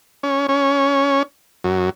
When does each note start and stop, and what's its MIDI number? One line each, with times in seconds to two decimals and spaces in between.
0.23 0.47 61
0.49 1.23 61
1.64 1.90 42